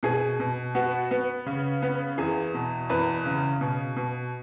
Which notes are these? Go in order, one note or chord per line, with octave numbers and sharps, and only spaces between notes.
B2 G#4
B2
B3 F#4
B3
C#3
B3
E2 G#4
B2
E2 B4
C#3
B2
B2